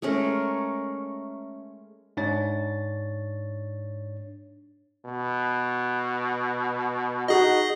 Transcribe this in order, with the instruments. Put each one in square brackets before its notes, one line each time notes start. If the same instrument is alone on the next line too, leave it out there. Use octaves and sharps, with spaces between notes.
[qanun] G#3 A3 C#4 A#4
[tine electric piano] G#2 D4 C#5 A6
[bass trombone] B2
[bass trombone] D#4 [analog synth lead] F#4 [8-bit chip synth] G#4 D#5